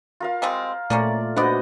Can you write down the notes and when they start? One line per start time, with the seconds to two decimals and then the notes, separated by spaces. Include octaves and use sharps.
0.20 F4 A#4 F5
0.42 G3 G#3 C4
0.90 A#2 F3 A3 A#3 C#4 D5
1.36 B3 D4 F#4 C5 D5 D#5 F#5